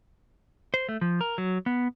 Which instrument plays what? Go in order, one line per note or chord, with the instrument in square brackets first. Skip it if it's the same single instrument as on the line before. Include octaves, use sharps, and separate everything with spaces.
[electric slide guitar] C5
A3
F3
A#4
F#3
B3